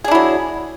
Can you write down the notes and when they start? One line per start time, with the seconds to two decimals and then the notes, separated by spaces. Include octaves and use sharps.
0.04 G#4
0.08 D4
0.11 E4
0.15 F#3